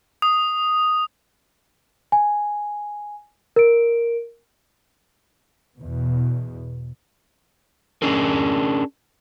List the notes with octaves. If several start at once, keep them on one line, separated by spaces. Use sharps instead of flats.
D#6
G#5
A#4 D7
E2 B2
C#4 D4 G#4 A#4